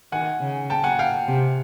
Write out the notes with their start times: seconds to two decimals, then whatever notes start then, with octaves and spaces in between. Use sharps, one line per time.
0.12 D#3 F#5 G#5
0.41 C#3
0.70 G5 A5
0.84 F#5 G#5
0.99 F5 G5
1.28 C3